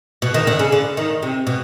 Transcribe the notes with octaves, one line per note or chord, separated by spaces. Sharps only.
B2
D#3
D3
C#3
D3
D#3
C3
B2